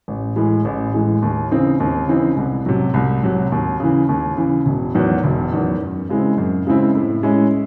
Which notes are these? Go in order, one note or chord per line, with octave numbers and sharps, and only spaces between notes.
A1
A2 E3 G#3
A1
A2 E3 G#3
D#2
C#3 E3 C4 D#4
D#2
C#3 E3 C4 D#4
C2
C3 F#3
C2
C3 F#3
D#2
C#3 E3
D#2
C#3 E3
E1
E2 D#3 F#3
E1
E2 D#3 F#3
F#2
C#3 G#3 C4 E4
F#2
C#3 G#3 C4 E4
A2
G#3 C#4 E4